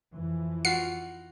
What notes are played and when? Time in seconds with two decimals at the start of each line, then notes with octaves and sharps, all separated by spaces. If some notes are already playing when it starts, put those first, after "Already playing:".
0.14 F2 E3
0.65 F4 F#4 C7